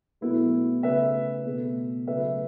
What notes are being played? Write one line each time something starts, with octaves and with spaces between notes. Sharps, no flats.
B2 F#3 A3 B3 E4
C#3 A3 B4 E5
B2 A3
C#3 F#3 A3 B4 E5